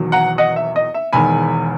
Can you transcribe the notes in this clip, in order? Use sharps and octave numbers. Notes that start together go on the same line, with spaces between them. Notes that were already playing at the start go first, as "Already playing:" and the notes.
Already playing: E1 E2 D#3 F#3
F#5 A#5
D#5 F#5
E5
D#5
E5
E1 E2 D#3 G#3 G#5 B5